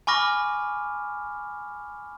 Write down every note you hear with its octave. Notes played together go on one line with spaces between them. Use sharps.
G#5 B5 C#6 D6 F6 A#6